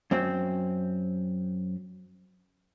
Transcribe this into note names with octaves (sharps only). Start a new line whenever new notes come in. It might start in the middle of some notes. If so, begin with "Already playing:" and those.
F#2 C4